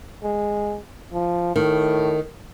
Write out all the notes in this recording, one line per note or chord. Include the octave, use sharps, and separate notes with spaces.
G#3
F3
A2 D#3